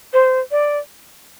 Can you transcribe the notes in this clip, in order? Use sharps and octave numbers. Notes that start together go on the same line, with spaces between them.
C5
D5